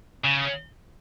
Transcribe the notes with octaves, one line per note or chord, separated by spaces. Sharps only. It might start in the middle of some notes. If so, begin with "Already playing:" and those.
C#3